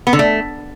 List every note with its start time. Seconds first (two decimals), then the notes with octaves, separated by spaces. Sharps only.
0.07 B3
0.13 D3
0.19 A3